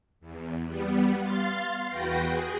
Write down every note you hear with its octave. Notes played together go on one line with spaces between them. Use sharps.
E2
G3 B3
F5 C6 A6
E2 F#4 B4 G5 G6 A#6
G#4